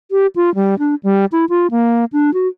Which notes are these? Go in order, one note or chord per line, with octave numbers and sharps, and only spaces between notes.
G4
F4
G3
D4
G3
E4
F4
A#3
D4
F#4